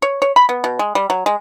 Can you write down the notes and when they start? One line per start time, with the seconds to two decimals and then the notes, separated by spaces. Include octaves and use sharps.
0.02 C#5
0.22 C#5
0.36 B5
0.49 B3
0.64 B2
0.79 G#3
0.95 G3
1.10 F#3
1.26 G#3